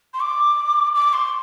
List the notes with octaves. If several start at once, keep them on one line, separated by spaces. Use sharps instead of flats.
C6
D6
D6
C6